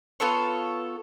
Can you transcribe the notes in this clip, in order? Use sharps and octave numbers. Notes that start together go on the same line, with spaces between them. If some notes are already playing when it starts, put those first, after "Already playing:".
B3 F4 A4 C#5